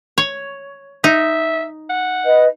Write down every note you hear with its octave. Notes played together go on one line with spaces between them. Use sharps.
C#5
D#4 E5
F#5
B4 D#5